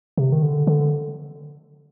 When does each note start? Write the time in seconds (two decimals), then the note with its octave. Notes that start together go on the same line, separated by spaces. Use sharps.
0.18 C3
0.32 D#3
0.42 D3
0.67 D3